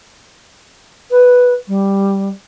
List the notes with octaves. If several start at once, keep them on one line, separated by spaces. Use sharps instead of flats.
B4
G3